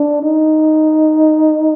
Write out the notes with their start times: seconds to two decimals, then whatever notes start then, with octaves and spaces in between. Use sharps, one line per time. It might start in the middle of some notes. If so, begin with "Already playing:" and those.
Already playing: D4
0.22 D#4